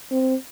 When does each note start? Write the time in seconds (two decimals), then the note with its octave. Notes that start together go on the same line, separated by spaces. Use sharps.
0.11 C4